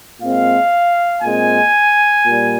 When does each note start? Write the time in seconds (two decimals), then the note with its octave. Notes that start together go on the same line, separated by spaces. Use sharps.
0.21 A#2 G#3 C4 F5
1.23 A#2 G#3 C4 G#5
2.26 A#2 G3